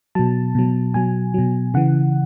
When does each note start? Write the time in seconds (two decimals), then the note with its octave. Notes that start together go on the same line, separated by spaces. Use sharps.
0.15 B2 F#3 A5
0.55 B2 F#3
0.94 B2 F#3 G#5
1.34 B2 F#3
1.74 C#3 E3 F#5